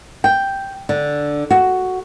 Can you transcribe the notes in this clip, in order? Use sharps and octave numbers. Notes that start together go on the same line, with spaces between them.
G5
D3
F#4